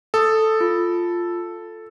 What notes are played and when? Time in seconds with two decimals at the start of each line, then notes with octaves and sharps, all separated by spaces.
0.14 A4 D#6
0.61 F4